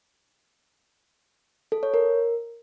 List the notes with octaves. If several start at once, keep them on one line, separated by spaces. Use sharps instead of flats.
A4
C#5
A#4